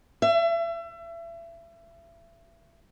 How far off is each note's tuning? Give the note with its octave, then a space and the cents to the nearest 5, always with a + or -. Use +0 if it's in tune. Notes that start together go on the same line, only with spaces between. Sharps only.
E5 +35